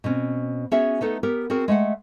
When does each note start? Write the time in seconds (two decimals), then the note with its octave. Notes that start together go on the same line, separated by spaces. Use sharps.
0.04 B2 C4 C#4
0.71 B3 C#4 F#4 G#4 C#5 E5
1.01 A3 B3 D#4 A4
1.23 B3 G4 A#4
1.50 C4 F#4 G#4 A#4
1.68 G#3 A3 E5 F#5